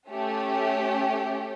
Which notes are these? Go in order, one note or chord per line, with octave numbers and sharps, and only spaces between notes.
A3 C#4 G4